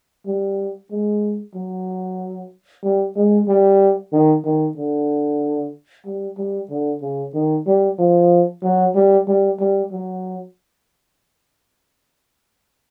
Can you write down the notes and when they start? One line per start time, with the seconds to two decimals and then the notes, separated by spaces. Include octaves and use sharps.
0.26 G3
0.91 G#3
1.56 F#3
2.84 G3
3.16 G#3
3.48 G3
4.12 D#3
4.45 D#3
4.77 D3
6.06 G3
6.38 G3
6.70 D3
7.02 C#3
7.34 D#3
7.66 G3
7.99 F3
8.63 F#3
8.95 G3
9.28 G3
9.60 G3
9.92 F#3